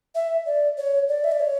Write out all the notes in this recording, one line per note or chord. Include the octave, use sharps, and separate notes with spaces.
E5
D5
C#5
D5
E5
D5
C#5